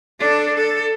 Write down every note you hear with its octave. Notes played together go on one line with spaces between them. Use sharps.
D4 A4
A4